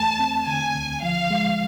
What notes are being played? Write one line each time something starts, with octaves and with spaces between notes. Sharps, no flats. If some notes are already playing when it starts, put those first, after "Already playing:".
Already playing: E2 A3 A5
C4
D3 G#5
D2
F3 F5
G#3